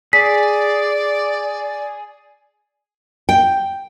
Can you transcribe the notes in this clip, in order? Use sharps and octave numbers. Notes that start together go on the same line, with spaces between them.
G#4 D5 B6
G5